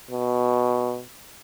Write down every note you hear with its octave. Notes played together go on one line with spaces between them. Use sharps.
B2